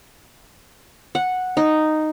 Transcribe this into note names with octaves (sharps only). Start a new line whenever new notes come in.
F#5
D#4